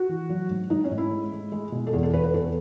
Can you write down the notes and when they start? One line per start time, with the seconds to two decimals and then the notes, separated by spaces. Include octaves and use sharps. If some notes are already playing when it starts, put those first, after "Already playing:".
Already playing: F#4
0.09 E3
0.30 F#3
0.50 G#2
0.70 G#2 D#4
0.84 C#4
0.91 G#2
0.98 E4
1.11 G#3
1.32 G#3
1.52 G#3
1.72 B2
1.87 A4
1.93 E2 G#4
2.03 A4
2.13 E2 B4
2.24 B4
2.34 E2 A4